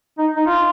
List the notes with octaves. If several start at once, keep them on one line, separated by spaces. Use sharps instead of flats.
D#4
D#4
F4